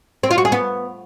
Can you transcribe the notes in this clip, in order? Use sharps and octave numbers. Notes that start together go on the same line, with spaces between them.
C4
F4
F#4
G#4
B3